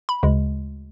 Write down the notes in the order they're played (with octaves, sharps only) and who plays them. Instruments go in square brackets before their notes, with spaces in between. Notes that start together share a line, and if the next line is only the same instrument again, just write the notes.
[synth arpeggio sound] B5
D2 C#3 G#3